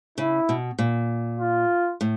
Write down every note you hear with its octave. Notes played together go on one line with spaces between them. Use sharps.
C#3 E4
B2
A#2
F4
A2